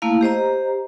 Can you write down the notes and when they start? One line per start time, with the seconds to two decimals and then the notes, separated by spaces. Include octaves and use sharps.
0.02 A3 A#3 E4 F5
0.21 G4 C5 D#5 A#5